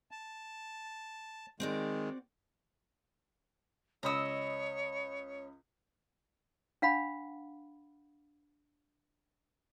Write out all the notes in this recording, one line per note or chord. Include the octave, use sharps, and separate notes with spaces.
A5
D#3 G#3 C4 F#4 D5
C#2 C#5 D#5 B5 D#6 E6
D4 F5 F#5 B5